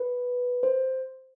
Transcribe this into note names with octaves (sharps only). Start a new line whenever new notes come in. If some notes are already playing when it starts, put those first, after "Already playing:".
Already playing: B4
C5